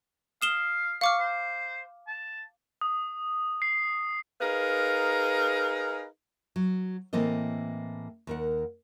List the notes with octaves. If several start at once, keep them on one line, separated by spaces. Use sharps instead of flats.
F5 D#6 E7 G7
F5 C#6 D6 F6
C5
A5
D#6
C7
D#4 G#4 A#4 B4 F5
F#3
A2 E3 A#3 C4 A4 D#5
D#2 A#4 F#5